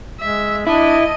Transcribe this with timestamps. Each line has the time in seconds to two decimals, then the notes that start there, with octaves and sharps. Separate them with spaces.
0.20 G#3 E5
0.67 D4 E4 D#5